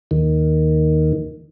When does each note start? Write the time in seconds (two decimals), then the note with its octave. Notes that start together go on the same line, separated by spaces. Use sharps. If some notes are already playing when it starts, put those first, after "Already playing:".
0.11 D#2 D#3